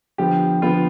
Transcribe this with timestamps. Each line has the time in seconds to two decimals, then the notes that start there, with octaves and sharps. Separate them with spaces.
0.18 D3 F3 B3 G4
0.62 D3 F3 B3 F4